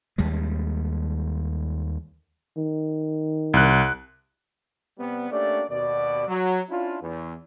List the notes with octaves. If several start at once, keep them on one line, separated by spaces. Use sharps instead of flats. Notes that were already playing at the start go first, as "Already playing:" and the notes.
D#2 G3 G#3
D#3
C2 F#6
C3 G3 B3
A3 A#3 C#4 D4 G4 D5
D#2 B2 D5
F#3
C#4 D4 E4 F4
E2